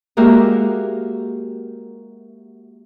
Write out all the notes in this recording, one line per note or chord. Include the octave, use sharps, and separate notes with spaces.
G#3 A#3 F#4 G4 A#4 E5